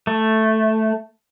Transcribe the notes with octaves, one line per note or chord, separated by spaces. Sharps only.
A3